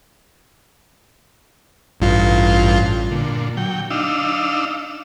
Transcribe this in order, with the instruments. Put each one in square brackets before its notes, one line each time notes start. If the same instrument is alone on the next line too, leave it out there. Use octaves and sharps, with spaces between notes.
[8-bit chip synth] A1 G2 F4
[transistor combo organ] A#2 D3
F#3 G5
D4 D#4 F5 E6